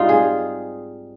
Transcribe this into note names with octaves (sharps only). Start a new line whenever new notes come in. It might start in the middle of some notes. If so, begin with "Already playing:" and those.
Already playing: G#2 G3 C4 D#4 F4
G#4